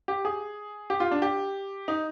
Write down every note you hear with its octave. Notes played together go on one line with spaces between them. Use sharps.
G4
G#4
G4
F4
D4
G4
D#4